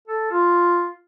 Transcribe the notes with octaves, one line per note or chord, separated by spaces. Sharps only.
A4
F4